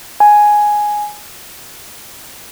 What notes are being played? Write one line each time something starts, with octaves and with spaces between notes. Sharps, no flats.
G#5